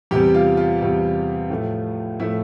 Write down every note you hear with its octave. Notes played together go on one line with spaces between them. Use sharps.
E2 C3 G3 G4
F4
F4
E2 C3 G3
A2 F3 A3
A2 F3 A3 E4